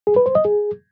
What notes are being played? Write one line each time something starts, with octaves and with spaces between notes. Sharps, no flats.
G#4
B4
C5
D#5
G#4